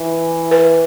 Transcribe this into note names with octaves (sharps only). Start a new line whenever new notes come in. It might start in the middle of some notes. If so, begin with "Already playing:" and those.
Already playing: E3
B4